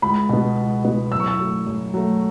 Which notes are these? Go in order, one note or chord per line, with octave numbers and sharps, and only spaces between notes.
C#2 B5
B2 B3
C#2
B2 B3
F#2 E6
C#6
E6
F#3 A3
F#2
F#3 A3